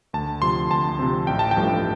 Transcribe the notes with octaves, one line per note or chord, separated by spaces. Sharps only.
D2 A5
C3 F3 C4 C6
D2 A5
C3 F3 C4
A1 G5
A5
G5
G2 F3 A3